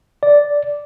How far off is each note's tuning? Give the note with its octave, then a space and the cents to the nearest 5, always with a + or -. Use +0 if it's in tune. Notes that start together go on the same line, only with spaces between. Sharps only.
D5 -5